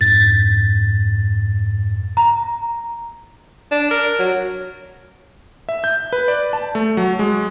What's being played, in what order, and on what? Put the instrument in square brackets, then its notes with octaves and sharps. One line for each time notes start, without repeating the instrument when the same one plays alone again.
[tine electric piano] F2 G#2 [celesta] A6
[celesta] A#5
[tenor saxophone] D4
A#4
F#3
[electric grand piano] E5
G6
B4
D5
A5
A3
F#3
G#3